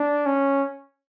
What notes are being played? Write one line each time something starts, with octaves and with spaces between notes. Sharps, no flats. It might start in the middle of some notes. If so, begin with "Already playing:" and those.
Already playing: D4
C#4